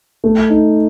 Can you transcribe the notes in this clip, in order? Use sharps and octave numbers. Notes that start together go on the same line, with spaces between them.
A3
D#4